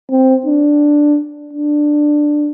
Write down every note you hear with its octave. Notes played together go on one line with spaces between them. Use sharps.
C4
D4
D4